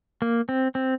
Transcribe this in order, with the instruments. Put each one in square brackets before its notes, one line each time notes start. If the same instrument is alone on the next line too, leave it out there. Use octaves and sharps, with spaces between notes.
[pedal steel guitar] A#3
C4
C4